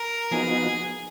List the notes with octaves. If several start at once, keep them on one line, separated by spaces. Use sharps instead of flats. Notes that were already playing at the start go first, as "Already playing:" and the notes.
Already playing: A#4
F3 B3 D#4 F#4 G#4